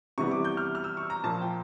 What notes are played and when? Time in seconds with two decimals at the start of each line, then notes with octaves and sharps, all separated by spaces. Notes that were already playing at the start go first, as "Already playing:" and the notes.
0.18 C3 E3 G3 B3 C#6
0.31 D6
0.44 G6
0.57 F6
0.75 F6
0.84 E6
0.97 C#6
1.10 A#5
1.24 A#2 F3 A#3 A5
1.41 G5